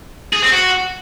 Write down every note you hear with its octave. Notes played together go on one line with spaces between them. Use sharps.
G#4
C4
F#4